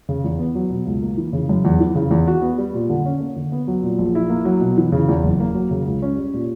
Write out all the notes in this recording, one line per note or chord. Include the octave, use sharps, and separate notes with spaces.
C#3
E2
B3
F#3
B2
C#2
A#3
E3
C#3
F#2
E2
E3
C#3
E2
F#4
B3
G3
A#2
D3
C#4
A#3
D3
B3
F#3
A#2
A#1
E4
A#3
F#3
B2
E3
C#3
E2
F#1
A#3
F#3
C#3
C#2
C#4
G3
A#2